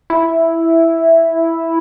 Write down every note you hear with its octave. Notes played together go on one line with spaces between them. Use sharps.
E4